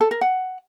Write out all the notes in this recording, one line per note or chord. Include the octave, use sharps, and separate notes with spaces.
A4
A#4
F#5